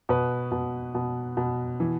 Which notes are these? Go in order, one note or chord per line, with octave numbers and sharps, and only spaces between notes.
B2 B4
B2
B2
B2
E3